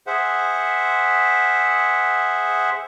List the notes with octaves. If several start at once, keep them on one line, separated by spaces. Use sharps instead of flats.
G#4 C5 E5 F#5